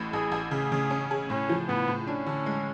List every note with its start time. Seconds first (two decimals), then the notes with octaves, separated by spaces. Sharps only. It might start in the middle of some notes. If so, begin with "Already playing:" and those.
Already playing: A1 A2
0.13 A1 G#4
0.32 A1
0.51 C#3 G#4
0.72 C#3
0.90 C#4
1.11 G#4
1.30 A2 C#4
1.49 F3
1.68 A2 B3
1.88 A2
2.07 C#4 D4
2.26 D3
2.46 G#3